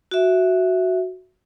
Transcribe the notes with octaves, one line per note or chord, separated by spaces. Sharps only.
F#4 E5